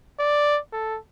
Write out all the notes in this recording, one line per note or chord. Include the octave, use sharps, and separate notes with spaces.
D5
A4